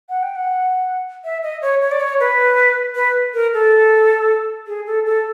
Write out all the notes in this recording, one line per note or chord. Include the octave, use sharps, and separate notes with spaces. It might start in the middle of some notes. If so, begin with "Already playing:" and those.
F#5
G5
F#5
E5
D#5
C#5
C#5
D5
C#5
B4
B4
A#4
A4
G#4
A4
A4